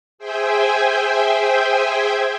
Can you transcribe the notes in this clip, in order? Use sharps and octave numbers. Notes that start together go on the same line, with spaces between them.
G#4 C5 E5 G5 G#5